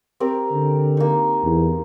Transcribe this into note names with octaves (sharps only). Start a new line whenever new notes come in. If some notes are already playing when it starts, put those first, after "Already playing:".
C4 G4 A#4
D3
A#3 D#4
E2